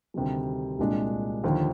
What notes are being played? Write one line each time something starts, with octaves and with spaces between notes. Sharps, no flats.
D2 C3 D#3 G3
C2 A#2 G#3 D4
D#2 D3 F3